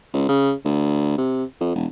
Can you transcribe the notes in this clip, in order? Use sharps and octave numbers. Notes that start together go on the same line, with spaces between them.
C#2
C#3
D2
C3
F2
E1